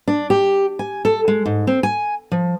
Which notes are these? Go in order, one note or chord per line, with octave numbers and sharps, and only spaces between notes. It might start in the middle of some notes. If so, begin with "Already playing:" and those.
D4
G4
G#5
A4
G#3
G#2
C4
G#5
F3